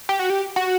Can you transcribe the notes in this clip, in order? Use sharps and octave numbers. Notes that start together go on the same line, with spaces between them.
G4
F#4
G4
F#4